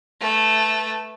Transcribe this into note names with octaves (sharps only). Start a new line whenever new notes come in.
A3 B4